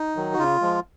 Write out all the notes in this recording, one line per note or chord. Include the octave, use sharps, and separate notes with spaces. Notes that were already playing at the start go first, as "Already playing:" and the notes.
Already playing: D#4
D#3 F#3
F#4
C#3 F4
F3 G#3